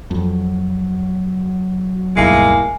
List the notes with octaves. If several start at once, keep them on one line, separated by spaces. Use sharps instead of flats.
F2 F#3
D1 B1 G2 G#3 A#3 E4 G#5 C7